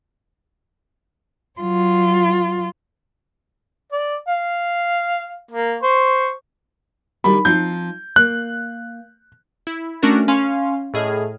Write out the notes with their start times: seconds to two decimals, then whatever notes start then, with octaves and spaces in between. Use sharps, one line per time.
1.60 F#3 F4
3.92 D5
4.28 F5
5.51 A#3
5.83 C5 C#6
7.24 D#3 G3 D4 B5
7.45 F3 C4 D#4 G6
8.16 A#3 F#6
9.67 E4
10.02 A3 C#4 D4 F#4 A#4 A6
10.28 C#4 F5 G#5 C6
10.94 A2 G#4 D#5 F6